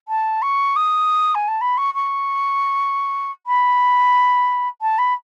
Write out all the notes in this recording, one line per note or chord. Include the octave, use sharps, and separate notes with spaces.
A5
C#6
D#6
G#5
A5
B5
C#6
C#6
B5
A5
B5